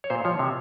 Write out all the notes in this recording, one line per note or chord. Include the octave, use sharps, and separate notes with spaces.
C#5
A#2 C5
F3 C#5
C3